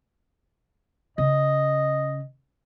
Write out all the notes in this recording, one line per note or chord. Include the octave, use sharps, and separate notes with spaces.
C#3 D#5